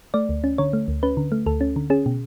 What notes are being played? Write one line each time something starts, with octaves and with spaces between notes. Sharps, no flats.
A3 D5
D2
C#4
D3 C#5
A3
D2
C#4 B4
D3
A3
D2 A4
C#4
D3
C#4 G#4
B2